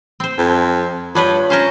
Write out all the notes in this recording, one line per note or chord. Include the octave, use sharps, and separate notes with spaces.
C4 C5
F2
G2 B3 D4 F4 B4 C#5
C#4 A#4 C5 F5